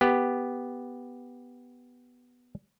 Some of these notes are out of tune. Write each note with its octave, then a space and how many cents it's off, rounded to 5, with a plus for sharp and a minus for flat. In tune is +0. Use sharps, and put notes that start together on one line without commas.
B3 +0 G4 +5